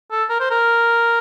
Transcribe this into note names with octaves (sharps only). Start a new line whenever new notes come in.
A4
A#4
C5
A#4